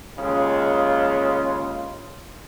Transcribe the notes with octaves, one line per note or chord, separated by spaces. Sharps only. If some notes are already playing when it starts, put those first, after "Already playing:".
D#2 C#3 G#3 F4